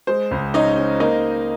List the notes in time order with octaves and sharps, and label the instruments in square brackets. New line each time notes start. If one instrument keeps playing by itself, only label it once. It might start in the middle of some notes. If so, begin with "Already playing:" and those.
[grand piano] G#3 [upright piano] C5
[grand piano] C#2
[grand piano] C#4 [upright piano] D#4 D#5
[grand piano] C#4
[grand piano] A#3 [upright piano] D#4 D#5